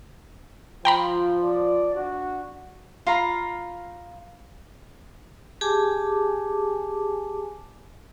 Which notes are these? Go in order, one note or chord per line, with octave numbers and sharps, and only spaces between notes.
F3 F4 C5 G5 A#5 B5
D5
D4 F#4
F4 F5 A#5 B5
G4 G#4 G#5 A5 D6